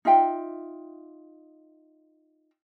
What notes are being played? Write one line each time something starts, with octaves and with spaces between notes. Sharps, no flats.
D#4 F4 E5 G5